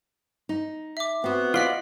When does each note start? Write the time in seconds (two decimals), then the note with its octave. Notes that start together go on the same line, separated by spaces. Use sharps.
0.49 D#4
0.97 E5 D6
1.24 B3 C4 F#4
1.54 F4 D5 D#5 F#5 B6 G7